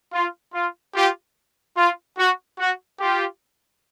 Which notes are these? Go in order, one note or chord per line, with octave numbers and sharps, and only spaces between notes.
F4
F4
F4 G4
F4
F#4
F#4
F4 G4